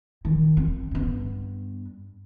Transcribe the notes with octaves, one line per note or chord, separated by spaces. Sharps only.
D#3
C4
G2 B3